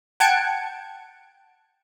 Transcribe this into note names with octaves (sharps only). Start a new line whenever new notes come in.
F#5 G5 A5 G#6 C#7 D7